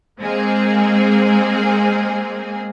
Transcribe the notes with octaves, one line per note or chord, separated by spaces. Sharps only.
G#3 A#3 C4 G#4